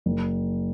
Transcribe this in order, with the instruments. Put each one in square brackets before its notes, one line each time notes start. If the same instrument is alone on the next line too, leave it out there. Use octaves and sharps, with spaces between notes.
[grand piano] F#1